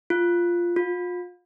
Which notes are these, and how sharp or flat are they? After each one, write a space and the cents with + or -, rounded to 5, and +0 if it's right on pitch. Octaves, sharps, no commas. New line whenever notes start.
F4 -5
F4 +35